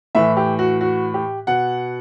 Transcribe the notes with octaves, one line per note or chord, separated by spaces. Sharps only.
A2 E3 E5
G4
F#4
F#4
G4
B2 F#5